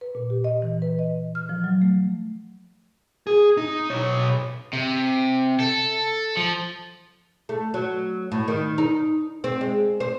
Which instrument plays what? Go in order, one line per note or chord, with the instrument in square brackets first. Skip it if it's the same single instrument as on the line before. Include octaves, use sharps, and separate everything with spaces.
[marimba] B4
A#2
G4
D#5
E3
B4
D#5
F6
F3
F#3
A3
[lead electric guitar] G#4
D#4
B1 C#5
[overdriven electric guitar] C3
A4
F3
[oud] A3
F#3
A2
D#3
D#4
C4
G#3
C5